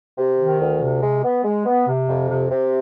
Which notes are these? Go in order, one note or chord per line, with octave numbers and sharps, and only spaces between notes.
C3
D#3
D2
C3
G#3
B3
G#3
B3
C3
F2
C3
C3